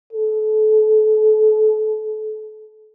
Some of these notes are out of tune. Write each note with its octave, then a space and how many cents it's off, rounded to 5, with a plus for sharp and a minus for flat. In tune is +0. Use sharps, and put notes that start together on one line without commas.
A4 -30